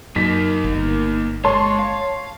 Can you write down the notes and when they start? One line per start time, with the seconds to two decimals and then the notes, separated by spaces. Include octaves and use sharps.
0.16 F#2 A#3 D#4 B6
0.64 G1
1.45 G#3 C#5 A5 C6
1.79 F5